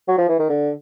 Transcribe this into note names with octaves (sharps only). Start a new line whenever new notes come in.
F#3
F3
E3
D#3
D3